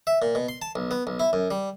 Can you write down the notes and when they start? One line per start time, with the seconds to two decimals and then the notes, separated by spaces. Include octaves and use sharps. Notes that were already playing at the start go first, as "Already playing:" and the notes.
0.07 E5
0.22 A#2
0.35 B2
0.49 C6
0.62 A5
0.76 B1
0.91 B3
1.07 B1
1.20 E4
1.33 F#2
1.51 G3